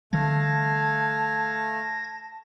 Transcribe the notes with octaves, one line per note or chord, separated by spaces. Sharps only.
D3 E3 G3 A3 F5 A5 G#6 A#6